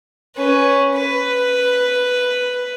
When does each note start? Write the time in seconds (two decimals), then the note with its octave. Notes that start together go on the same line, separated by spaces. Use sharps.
0.36 C#4 B4
0.95 B4